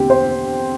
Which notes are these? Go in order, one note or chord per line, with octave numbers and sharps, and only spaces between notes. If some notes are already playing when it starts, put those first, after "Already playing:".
Already playing: E2 D3 C4 G4
C5